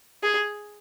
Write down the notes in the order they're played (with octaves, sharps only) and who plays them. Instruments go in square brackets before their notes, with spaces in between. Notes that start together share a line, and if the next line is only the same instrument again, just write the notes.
[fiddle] G#4